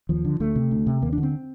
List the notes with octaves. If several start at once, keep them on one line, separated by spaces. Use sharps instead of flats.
D#2 F3
D3
D2 A3
C3
D2
C3
D#2 A#3
D4
D3
C4